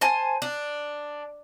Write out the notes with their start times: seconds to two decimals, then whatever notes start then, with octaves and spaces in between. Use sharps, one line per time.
0.01 C5 G#5 A5
0.42 D4